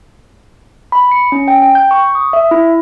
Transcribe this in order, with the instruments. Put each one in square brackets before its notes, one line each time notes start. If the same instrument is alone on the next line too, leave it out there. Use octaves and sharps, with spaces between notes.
[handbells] B5
C#7
C#4
G5
G5
G6
C#6
D#6
E5
E4